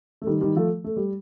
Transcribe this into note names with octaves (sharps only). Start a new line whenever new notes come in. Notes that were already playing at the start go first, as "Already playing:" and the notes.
A3
D#3 G3
D#3 G3
F3 A3
A3
G3